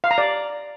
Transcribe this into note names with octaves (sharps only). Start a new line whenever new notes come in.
F5
A#5
D5